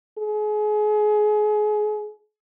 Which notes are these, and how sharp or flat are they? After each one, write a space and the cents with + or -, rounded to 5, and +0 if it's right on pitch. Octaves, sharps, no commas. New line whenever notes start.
G#4 +30